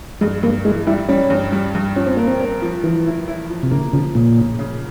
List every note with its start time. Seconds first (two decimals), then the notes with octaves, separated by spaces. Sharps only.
0.21 G2 G#3
0.43 G2 A#3
0.65 E3 G#3
0.87 G3 E4
1.08 G3 C#4
1.30 G2
1.52 G3
1.75 G2
1.96 F3 C#4
2.06 C4
2.17 A#3 A#4
2.28 C4
2.41 A#4
2.62 F3
2.84 E3 F3
3.06 E4
3.28 E4
3.50 F3
3.63 C3
3.71 C#3 A#3
3.93 C#3 F3
4.15 A#2 C#3
4.37 C#3
4.59 C#3